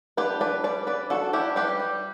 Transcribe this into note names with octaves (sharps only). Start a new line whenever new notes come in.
D4 G4 B4
D4 B4 D5
G3 B4 D5
G3 B4 D5
D4 F#4 A4
D4 E4 G4
G3 G4 B4
G3